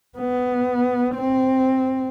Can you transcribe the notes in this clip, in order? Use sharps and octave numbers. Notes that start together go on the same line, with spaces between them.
B3
C4